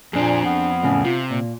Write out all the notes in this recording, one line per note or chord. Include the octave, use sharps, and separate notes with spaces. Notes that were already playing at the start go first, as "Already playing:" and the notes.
F2 A#2 C4 D4 G#4
B3
E2 A2 C#3
C3 F4
A#2